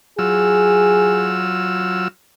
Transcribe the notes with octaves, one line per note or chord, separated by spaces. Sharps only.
F#3 F4 G#4 E6